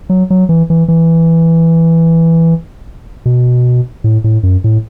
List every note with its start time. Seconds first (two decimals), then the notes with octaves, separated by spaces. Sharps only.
0.10 F#3
0.30 F#3
0.49 E3
0.70 E3
0.88 E3
3.26 B2
4.04 A2
4.24 A2
4.43 F#2
4.64 A2